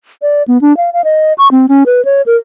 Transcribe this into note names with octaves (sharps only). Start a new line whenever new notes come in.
D5
B3
D4
F5
F5
D#5
C#6
C4
C#4
B4
C#5
A#4